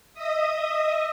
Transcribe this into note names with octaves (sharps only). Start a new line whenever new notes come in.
D#5 E5 D#6